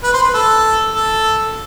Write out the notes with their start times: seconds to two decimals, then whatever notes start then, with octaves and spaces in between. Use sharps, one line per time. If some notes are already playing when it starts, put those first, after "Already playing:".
0.03 B4
0.13 C5
0.23 B4
0.34 A4
0.94 A4